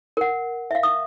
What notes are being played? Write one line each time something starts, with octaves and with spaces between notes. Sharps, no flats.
A#4 F#5
E5 F5
D#6